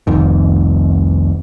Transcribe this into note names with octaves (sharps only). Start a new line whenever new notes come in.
F1 C2 F2 D#3